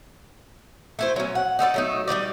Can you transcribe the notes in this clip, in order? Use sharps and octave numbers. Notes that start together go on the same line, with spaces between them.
A3 E4 C5
F#3 C#4
F#5
D#4 A4 C5 D5
F#3 A3 D#4
G3 G#3 D#4 D5